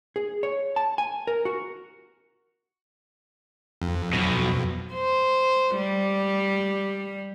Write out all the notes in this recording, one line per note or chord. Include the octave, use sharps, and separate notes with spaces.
G#4
C#5
A5
G#5
A#4
F#4
F2
B1 B2
C5
G3